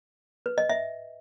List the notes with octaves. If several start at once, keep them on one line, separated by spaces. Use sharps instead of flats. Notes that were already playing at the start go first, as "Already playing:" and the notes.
B4
D#5
E5